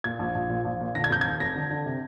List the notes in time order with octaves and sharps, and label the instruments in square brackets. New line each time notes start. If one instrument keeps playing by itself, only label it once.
[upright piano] A#2 G#6
A#1
A#1
A#2
A#1
A#2
D3 A#6
G#6
F1 G6
G#6
D#2
F1 A#6
D3
D3
C3